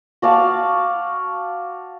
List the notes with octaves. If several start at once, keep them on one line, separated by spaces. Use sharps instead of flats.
F#4 D5 F5 A5